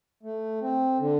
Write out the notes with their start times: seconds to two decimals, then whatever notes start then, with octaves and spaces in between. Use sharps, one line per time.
0.23 A3
0.61 C4
1.00 D3